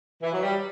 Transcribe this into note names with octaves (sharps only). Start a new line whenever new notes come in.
E3
F#3
G3